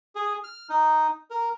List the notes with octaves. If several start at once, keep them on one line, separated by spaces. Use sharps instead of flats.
G#4
F6
D#4
A#4